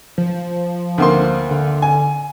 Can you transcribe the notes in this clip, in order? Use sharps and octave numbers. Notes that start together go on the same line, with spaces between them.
F3
D2 A#3 C6
D3
G#5